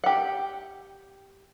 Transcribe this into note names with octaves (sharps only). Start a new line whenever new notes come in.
G4 F#5